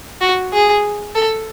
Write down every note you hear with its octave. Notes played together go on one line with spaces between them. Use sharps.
F#4
G#4
A4